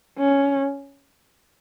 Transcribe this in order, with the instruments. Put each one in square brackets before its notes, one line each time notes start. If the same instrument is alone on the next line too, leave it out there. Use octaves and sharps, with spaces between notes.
[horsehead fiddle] C#4